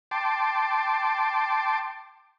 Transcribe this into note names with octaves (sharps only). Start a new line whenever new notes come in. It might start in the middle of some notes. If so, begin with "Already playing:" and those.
G5 A5 C6 D6